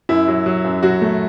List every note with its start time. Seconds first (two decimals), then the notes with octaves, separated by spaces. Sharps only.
0.09 F#2 E4
0.28 F#3
0.46 F#3
0.64 F#2
0.83 F#3 F#4
1.02 A3